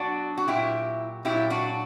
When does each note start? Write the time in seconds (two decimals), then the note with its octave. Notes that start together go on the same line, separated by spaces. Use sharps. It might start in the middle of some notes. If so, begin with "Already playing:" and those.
Already playing: B2 F#3 D4 F#4
0.38 F#4
0.48 A#2 F#3 E4 G4
1.25 A#2 F#3 E4 G4
1.50 D4 F#4